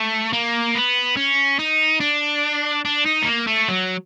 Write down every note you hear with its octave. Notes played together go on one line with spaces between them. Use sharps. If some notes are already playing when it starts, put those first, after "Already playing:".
Already playing: A3
A#3
B3
C#4
D#4
D4
D4
D#4
A3
A#3
A3
F#3